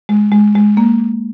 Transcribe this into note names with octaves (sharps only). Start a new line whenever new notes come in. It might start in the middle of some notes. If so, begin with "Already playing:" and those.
G#3
G#3
G#3
A#3